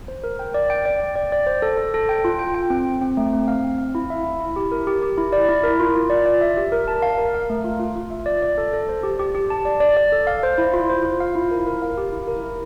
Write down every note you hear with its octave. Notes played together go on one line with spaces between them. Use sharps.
C5
A#4
G5
D5
G5
D5
G5
D5
D5
C5
A4
A4
A4
G5
F4
G5
G5
C4
C4
C4
A3
C4
F5
C4
F5
E4
E5
E4
E4
G4
A#4
G4
G4
E4
D5
E4
A#4
F4
F4
D5
D5
E5
G4
A#4
A5
F5
A#4
F5
A3
F4
F4
F4
E5
D5
D5
A4
A4
C5
G4
G4
G4
A5
D5
D5
D5
A4
F5
C5
E4
F4
C5
F4
F5
E4
A#4
A#4
F5
G4
E4
A#4
E4